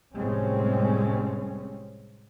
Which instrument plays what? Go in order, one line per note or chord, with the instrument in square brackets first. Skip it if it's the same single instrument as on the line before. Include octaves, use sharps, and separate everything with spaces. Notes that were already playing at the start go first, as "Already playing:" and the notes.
[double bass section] F1 A2 G3 G#3 C4 C#4